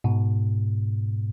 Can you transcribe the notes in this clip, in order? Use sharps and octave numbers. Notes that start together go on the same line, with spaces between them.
G#2 B2